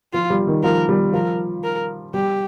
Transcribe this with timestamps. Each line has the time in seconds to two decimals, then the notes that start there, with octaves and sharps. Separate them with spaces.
0.13 F3 F4
0.30 G3
0.47 D#3
0.63 F3 A#4
0.89 G3
1.13 F3 A#4
1.64 A#4
2.14 G3 G4